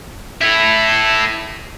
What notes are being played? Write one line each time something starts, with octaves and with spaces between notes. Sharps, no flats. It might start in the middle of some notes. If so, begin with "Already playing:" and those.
E4 A4